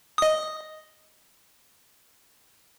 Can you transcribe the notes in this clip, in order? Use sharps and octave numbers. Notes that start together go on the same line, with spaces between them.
D#5 D#6